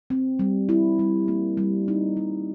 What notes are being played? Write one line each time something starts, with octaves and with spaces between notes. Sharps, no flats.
C4
G3
E4
G3
A#3
G3
D#4
G3